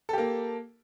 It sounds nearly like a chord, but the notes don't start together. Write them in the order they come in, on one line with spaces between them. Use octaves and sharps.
A4 G4 A#3